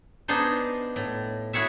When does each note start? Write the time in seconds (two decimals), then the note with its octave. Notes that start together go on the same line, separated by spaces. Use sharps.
0.28 B3 D4 D#4 G#4 C5
0.96 A2
1.53 E4 F#4 G#4 C#5 E5